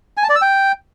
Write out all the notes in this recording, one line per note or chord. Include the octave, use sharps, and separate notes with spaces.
G#5
A5
D5
E6
G5